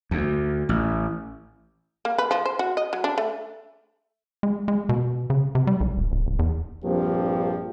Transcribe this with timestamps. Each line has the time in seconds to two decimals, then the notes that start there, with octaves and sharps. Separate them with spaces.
0.11 D2
0.69 A1
2.05 A#3
2.18 B4
2.31 F3
2.46 C5
2.59 F#4
2.77 D#5
2.93 F#3
3.04 D4
3.18 A3
4.43 G#3
4.68 G#3
4.89 B2
5.30 C#3
5.55 C3
5.67 G3
5.81 B1
5.98 D#1
6.12 D1
6.26 D1
6.39 E2
6.84 A#1 G2 F3 A#3 C4 G4